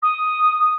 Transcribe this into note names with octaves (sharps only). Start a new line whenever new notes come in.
D#6